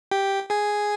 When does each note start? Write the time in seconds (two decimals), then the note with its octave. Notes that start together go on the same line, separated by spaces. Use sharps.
0.12 G4 G5
0.50 G#4 G#5